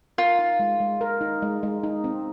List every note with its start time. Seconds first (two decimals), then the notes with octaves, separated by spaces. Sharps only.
0.18 F4 A#4
0.39 D#4
0.60 G#3
0.80 G#3
1.01 A#4
1.21 D#4
1.42 G#3
1.63 G#3
1.83 D#4
2.04 C4